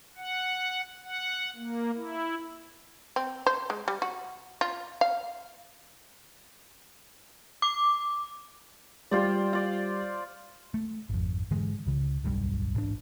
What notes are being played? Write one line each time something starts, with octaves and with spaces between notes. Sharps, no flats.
F#5
F#5
A#3
E4
C4
C5
G#3
G3
F#4
F4
F5
D6
G3 F4 C5 D5
F4 D5
A3
G#1 F2
G#2 D3 E3 G#3
C#2 C#3
D1 B1 G2 G3
A1 G#2 D4